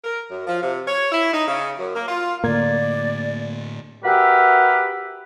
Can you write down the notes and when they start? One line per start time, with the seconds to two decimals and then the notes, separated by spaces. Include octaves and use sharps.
0.04 A#4
0.30 F#2
0.47 F3
0.62 C3
0.87 C#5
1.12 E4
1.34 D#4
1.47 C#3
1.78 F#2
1.95 A#3
2.08 F4
2.44 A2 D3 A#3 D5 G#6
4.05 F#4 G4 A#4 B4 E5